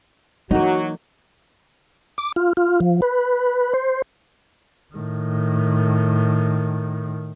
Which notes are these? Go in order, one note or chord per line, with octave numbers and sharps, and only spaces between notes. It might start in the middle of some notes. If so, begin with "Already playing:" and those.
E3 F#3 A#3 D#4 F#4
D6
F4
F4
F3
B4
C5
A2 D#3